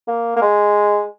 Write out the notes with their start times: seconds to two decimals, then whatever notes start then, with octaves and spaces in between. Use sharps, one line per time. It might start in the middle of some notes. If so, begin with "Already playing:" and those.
0.08 A#3
0.36 A#3
0.42 G#3